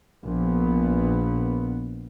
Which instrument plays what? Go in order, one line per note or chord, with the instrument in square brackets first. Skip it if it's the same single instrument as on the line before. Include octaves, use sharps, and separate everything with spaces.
[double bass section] A#1 B3